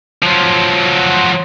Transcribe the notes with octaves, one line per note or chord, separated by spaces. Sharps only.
F3 F#3